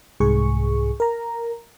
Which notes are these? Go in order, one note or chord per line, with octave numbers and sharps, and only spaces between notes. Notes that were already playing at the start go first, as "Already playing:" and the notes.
C2 G#2 G#4 C#6
A#4 A#5